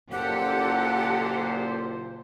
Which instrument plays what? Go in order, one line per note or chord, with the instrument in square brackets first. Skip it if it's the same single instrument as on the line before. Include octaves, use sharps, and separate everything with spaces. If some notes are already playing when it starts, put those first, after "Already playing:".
[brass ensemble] F#1 A#2 C5 [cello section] G4 A4 [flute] F#5